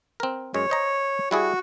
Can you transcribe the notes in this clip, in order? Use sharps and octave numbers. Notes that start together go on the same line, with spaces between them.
C4 A#4
F#2 G#3 C#5
C5 D#5 A#5
G3 E4 F#4 G#4